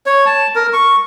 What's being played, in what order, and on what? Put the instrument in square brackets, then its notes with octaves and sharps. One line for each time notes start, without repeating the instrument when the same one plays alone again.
[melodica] C#5
A5
A#4
C#6